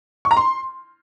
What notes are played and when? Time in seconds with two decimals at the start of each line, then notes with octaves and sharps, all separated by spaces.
0.25 C#6
0.31 A#5
0.37 C6